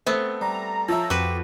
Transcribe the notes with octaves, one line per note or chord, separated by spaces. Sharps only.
A3 B3 C4
G3 A#5
F3 A4 C#5 E5
F2 C4 F#4 G4 B4